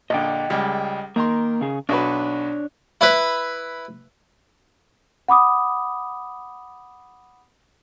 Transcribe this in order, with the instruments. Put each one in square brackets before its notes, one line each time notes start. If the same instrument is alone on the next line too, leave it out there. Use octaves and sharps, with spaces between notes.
[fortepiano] A#1 D3 [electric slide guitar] D#5 G5
[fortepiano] C#2 G3 G#3
[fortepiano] D#3 A#5 C6 [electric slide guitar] A#3
[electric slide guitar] C#3 G#4
[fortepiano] B1 F#4 B4 [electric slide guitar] D4 C#5
[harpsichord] E4 B4
[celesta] F#5 B5 D6 D#6